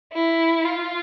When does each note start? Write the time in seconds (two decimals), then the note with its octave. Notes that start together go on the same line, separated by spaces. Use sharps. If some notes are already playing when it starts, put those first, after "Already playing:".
0.14 E4
0.65 F4